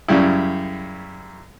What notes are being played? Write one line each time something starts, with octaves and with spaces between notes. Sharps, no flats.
F#2 C#3 G3 E4